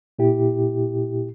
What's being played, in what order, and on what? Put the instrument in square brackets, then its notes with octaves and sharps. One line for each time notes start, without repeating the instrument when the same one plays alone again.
[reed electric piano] A#2 E4 G4